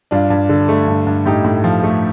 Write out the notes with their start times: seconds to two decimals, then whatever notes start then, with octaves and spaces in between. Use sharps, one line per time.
0.11 G2 D4 F4
0.30 G2
0.49 D3
0.69 A3
0.87 G2
1.07 G2
1.26 A2 D#4 G4
1.44 A2
1.64 F3
1.84 A3